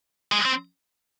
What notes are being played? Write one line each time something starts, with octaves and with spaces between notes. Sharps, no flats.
G#3
C4